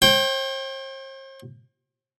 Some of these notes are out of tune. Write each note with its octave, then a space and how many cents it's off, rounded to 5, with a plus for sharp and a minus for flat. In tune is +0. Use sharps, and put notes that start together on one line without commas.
C5 +45 G5 +0